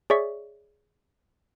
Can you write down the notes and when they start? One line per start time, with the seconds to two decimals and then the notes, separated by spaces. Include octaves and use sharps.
0.10 G#4 C#5 D5 E5 C#6 B6